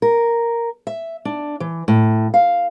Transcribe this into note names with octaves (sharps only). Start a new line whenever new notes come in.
A#4
E5
D4
E3
A2
F5